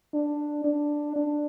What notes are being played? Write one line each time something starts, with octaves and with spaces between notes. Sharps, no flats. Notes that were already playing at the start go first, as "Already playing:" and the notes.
D4
D4
D4